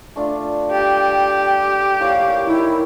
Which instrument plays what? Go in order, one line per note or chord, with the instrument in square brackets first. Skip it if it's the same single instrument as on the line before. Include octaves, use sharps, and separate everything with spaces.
[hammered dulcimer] A3 D4 F4
[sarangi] G4 [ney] G5 [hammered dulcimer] A5
[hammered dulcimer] A#2 E4 C#5 [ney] F5
[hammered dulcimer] D#3 [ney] E4